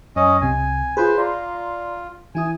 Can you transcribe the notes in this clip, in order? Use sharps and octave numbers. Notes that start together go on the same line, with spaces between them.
F#2 C#4 D#5
C2 C3 G#5
F4 G#4 B4 C5
F4 D5 A#5 C6
E3 E4 G#5 D#6